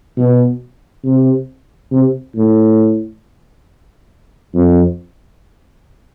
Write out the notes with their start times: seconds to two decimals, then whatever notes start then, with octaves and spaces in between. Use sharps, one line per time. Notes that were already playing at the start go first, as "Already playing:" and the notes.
0.17 B2
1.05 C3
1.91 C3
2.36 A2
4.54 F2